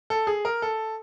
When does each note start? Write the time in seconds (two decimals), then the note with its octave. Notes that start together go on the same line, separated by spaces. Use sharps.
0.10 A4
0.27 G#4
0.45 A#4
0.62 A4